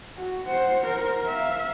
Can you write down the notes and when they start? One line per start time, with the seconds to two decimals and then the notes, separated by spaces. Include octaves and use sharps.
0.17 F#4
0.47 C5 F#5
0.85 A#4 C5
1.26 E5 F5